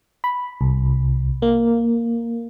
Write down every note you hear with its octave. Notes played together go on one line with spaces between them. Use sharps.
B5
C2
A#3